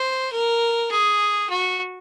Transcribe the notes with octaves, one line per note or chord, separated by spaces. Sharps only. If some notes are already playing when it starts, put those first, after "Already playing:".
Already playing: C5
A#4
G#4
F#4